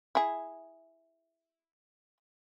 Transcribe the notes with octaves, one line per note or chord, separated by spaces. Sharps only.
E4 G#4